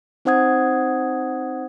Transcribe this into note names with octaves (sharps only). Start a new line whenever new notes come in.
C4 D#4 C5 F#5 D#6 G#6